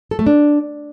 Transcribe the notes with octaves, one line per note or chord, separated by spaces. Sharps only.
A4
A3
D4